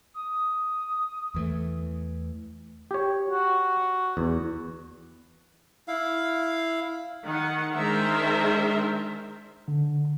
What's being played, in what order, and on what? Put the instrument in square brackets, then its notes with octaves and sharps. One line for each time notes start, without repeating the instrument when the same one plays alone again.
[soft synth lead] D#6
[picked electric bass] E2 E3 A3
[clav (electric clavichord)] G4 C#5
[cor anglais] F#4
[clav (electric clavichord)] E2
[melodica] E4 F5
[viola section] D#3 F#5
D#3 G#3 D4 A#4 C5 E5
[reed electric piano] D3